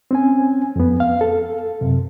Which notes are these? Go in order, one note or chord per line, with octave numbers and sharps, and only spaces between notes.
C4 C#4 G#5
F2 B3
F5
A4
F#2 C3